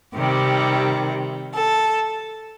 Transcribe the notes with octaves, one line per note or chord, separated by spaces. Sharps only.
C3 D#3 G3 G4
A4